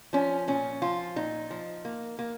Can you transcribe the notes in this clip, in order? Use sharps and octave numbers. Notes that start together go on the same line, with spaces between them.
F3 C#4
A#2 C#4
F3 F4
A#2 D#4
F3
A#3
A#3